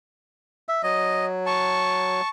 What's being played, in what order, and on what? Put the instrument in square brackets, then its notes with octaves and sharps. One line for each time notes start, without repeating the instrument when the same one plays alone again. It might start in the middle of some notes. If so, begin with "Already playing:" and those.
[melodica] E5
[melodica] F#3 [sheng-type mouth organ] D#5
[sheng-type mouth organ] A5 C#6